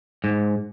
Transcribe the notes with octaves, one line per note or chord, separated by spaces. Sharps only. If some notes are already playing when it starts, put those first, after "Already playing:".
G#2